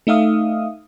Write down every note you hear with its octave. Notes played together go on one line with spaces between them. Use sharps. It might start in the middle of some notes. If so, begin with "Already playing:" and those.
A3 D#4 E5 F5 D#6